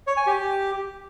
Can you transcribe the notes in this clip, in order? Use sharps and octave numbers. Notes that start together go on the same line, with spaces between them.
C#5
G#5
G4